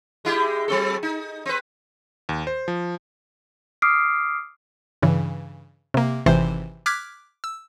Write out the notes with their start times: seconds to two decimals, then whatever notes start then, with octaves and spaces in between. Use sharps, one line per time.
0.25 G#3 E4 G4
0.68 F#3 C4 A4
1.03 D#4
1.46 C4 B4
2.29 D#2
2.47 C5
2.68 F3
3.82 D6 D#6 F6 C7 D7
5.02 G2 C#3 E3
5.94 C3 A#3
6.26 G#1 C3 E3 C5
6.86 D6 F6 F#6 G#6 B6
7.44 E6